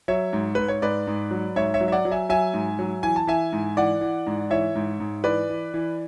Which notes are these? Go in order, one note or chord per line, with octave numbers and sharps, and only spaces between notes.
F#3 C#5 E5
G#2
G#2 B4
C#5
G#2 B4 D5
G#2
F#3
G#2 C#5 E5
C#5 E5
F#3
E5
D5 F#5
F#3
E5 G#5
F#3 E5 G#5
G#2
F#3
E3 G#5
A5
E3 E5 G#5
G#2
E3 D5 F#5
E3
G#2
E3 C#5 E5
G#2
G#2
E3 B4 D5
E3
E3